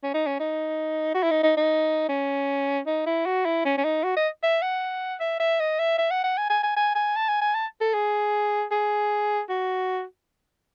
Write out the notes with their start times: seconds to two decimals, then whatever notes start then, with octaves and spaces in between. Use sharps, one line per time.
0.03 C#4
0.14 D#4
0.26 C#4
0.40 D#4
1.14 F#4
1.23 E4
1.31 D#4
1.43 D#4
1.57 D#4
2.09 C#4
2.87 D#4
3.06 E4
3.26 F#4
3.45 E4
3.65 C#4
3.78 C#4
3.84 D#4
4.04 F#4
4.16 D#5
4.43 E5
4.62 F#5
5.20 E5
5.40 E5
5.60 D#5
5.79 E5
5.98 E5
6.11 F#5
6.24 F#5
6.37 G#5
6.50 G#5
6.63 G#5
6.76 G#5
6.95 G#5
7.16 A5
7.28 G#5
7.41 G#5
7.54 A5
7.81 A4
7.94 G#4
8.71 G#4
9.49 F#4